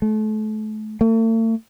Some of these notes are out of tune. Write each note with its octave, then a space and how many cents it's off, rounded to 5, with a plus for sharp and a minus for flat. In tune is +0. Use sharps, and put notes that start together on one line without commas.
A3 -35
A3 +45